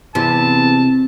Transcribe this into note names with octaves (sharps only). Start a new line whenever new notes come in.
E2 C3 A5